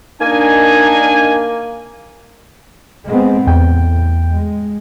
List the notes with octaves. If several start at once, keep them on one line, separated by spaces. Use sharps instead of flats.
A#3 D4 D#4 A#4 G#5
G#3 B3 C4
E2 A2 G5
G#3